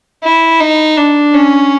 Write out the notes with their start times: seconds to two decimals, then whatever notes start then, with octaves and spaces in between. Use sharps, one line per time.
0.24 E4
0.60 D#4
0.97 D4
1.34 C#4